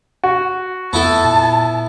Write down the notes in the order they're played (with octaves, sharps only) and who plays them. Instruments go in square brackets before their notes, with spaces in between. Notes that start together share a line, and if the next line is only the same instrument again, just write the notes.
[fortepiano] F#4
[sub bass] F2 [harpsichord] B3 E4 A4 [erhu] A5
[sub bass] A#2